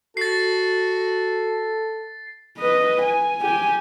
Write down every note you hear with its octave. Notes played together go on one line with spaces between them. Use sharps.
F#4 A4 A6 C7
B4 D#5
G#5
G4 G#5